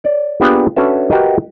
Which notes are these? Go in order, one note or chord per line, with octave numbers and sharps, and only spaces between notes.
C#5 D5
A#3 B3 D4 F4 G4 G#4
C#4 D4 F#4 A4 B4 E5
F#4 G4 A#4 B4 D#5 E5